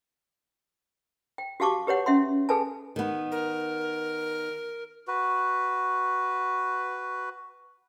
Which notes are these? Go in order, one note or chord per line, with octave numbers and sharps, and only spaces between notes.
G5
F#4 G4 F5 A5 C#6 D6
G4 B4 C#5 F#5
C#4 E5 F#5 C6
G#4 A4 B4 G#5 A5
D#3 B3
A#4
F#4 B4